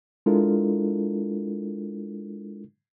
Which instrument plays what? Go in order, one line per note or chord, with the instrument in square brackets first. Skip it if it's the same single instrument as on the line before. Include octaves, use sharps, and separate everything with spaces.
[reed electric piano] G#3 D4 E4 F4 A4 A#4